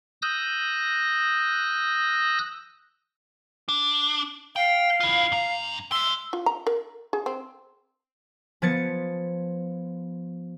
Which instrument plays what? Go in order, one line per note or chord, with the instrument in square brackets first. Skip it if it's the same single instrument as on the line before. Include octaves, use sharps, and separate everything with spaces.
[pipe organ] D#6 E6 F#6 G6 A#6
[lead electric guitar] D4
[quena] F5 [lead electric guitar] G5
[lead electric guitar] E4 F4
G2 A#5
[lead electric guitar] D#5 C6 [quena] E6
[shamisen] F4
A#5
A#4
G#4
C4
[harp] F3 B3 G#6 A6 C#7